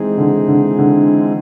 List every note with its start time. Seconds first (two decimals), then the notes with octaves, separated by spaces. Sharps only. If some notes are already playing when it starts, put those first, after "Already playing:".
Already playing: E3 G#3 C4 D#4 G#4
0.18 D3
0.48 D3
0.79 D3